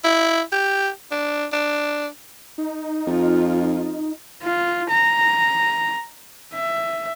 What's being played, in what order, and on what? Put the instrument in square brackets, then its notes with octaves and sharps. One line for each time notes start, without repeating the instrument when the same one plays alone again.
[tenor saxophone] E4
G4
D4
D4
[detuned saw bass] D#4
[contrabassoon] F2 [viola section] F4
[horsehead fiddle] F4
A#5
E5